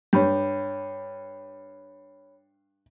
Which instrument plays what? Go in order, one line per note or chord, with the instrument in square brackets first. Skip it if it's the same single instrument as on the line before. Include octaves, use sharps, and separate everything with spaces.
[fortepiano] G2 [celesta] C#5 B5 G6